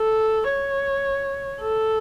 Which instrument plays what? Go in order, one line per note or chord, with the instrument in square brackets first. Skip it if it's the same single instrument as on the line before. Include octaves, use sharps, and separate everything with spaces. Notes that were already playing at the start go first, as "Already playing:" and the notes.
Already playing: [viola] A4
C#5
A4